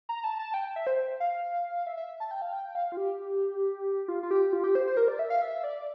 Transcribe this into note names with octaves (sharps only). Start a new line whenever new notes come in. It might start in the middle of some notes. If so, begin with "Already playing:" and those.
A#5
A5
A5
G5
E5
C5
F5
E5
E5
A5
G5
F5
G5
F5
F4
G4
F4
F4
G4
F4
G4
C5
C5
A#4
D5
E5
F5
E5
D5